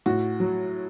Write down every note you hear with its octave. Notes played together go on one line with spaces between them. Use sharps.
A2 F#4
F#3